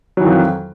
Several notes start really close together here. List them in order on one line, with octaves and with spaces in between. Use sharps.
F#3 E3 D#3 F2